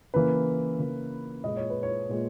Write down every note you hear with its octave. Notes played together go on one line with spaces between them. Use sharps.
C#3 E3 A#3 B4
C#3 E3 A#3
A#2 G#3 D#5
C#5
B4
C#5
A#2 G#3